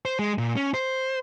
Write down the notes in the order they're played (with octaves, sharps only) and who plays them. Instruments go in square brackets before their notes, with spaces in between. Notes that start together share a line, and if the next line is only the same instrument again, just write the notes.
[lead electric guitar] C5
G#3
A#2
C#4
C5